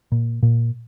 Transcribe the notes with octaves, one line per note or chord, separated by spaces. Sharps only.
A#2
A#2